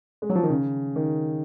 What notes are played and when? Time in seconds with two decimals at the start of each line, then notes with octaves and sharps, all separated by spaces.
0.22 G#3
0.30 F#3
0.35 F3
0.43 D#3
0.49 C#3
0.96 D#3